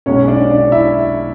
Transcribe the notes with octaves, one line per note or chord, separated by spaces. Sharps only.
B1 B2 G#3 C#4 C#5
D4 D5
D4 D5
E4 E5